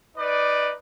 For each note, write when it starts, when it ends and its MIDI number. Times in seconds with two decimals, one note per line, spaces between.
0.18 0.74 63
0.18 0.74 71
0.18 0.74 74